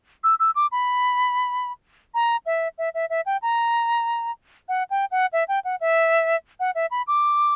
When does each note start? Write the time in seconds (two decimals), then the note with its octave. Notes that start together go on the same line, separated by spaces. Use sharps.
0.24 E6
0.40 E6
0.55 D6
0.72 B5
2.14 A#5
2.46 E5
2.78 E5
2.94 E5
3.10 E5
3.26 G5
3.42 A#5
4.68 F#5
4.90 G5
5.11 F#5
5.33 E5
5.48 G5
5.64 F#5
5.81 E5
6.60 F#5
6.75 E5
6.91 B5
7.07 D6